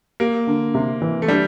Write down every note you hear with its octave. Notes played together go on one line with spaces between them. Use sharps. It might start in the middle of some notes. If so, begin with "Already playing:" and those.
A#3 G4
D3
C3
E3
A3
G3 D4